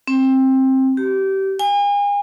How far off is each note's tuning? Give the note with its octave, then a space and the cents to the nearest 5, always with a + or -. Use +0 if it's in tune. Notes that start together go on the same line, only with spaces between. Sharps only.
C4 +15
G4 -25
G#5 -40